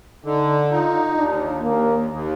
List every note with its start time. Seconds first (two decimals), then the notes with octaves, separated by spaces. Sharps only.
0.25 D3 D#4
0.71 D#4 F4
1.17 D#2 D4
1.63 D#2 A#3
2.10 D#2